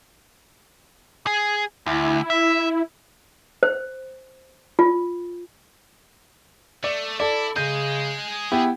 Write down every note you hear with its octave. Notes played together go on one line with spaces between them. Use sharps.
G#4
D2 E4
E5
C5
F4
A3 D5
E4 A4 D5
C#3 G#4 D#5 G6
B3 E4 G4